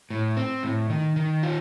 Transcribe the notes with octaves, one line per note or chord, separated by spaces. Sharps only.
A2
C4
A2
D#3
D#3
F4